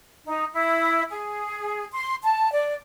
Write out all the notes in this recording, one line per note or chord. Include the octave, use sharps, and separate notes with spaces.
D#4
E4
G#4
C6
A5
D5